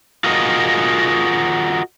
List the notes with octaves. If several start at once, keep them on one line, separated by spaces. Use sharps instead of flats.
F4 F#4 G#4 A#4 D#5